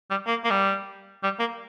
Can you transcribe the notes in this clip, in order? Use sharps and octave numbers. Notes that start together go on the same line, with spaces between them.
G3
A#3
A#3
G3
G3
A#3